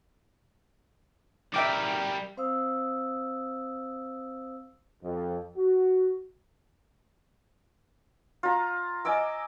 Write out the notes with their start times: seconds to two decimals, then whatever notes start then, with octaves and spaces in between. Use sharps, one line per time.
1.54 G3 A#4 E5 G5 D6
2.37 C4 C5 F5 D#6 E6
5.03 F2
5.57 F#4
8.43 F4 A#5
9.05 D#5 G#5 D6 E6